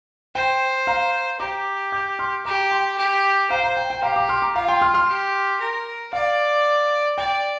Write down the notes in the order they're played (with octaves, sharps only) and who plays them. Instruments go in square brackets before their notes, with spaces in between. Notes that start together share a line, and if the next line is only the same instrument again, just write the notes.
[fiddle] C5 [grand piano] G5
[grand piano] F5 A#5
[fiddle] G4 [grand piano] A#5 D6
[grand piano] D6 G6
C6 F6
[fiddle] G4 [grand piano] A#5 D6
[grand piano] G5 C6
[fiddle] G4
[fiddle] C5 [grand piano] F5 A#5
[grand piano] F5 A#5
G5
G5
[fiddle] G4 [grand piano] F5 A#5
[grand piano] A#5 D6
C6 F6
A#5 D6
[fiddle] F4 [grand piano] F5 A#5
[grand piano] G5 C6
C6 F6
C6 F6
[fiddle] G4
A#4
[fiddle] D5 [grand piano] F5
[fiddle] D5 [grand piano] G5